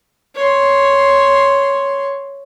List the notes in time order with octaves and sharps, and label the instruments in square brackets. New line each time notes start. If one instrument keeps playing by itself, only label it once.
[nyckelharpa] C#5 C6